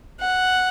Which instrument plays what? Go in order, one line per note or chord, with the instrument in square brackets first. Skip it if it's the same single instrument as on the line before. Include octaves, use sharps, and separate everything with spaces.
[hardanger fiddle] F#5